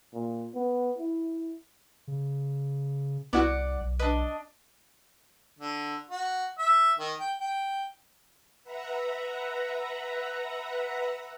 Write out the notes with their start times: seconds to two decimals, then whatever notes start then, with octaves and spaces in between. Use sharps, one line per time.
0.13 A#2
0.54 B3
0.98 E4
2.08 C#3
3.33 C2 B3 E4 F#4 D5 F#5
3.81 B1
3.99 D4 B4 D#5
5.59 D3
6.11 F#4
6.58 E5
6.98 D#3
7.19 G5
7.40 G5
8.64 B4 E5 F#5 A#5